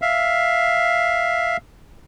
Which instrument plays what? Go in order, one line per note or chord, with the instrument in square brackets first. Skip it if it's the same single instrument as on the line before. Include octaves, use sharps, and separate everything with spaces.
[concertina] E5 F5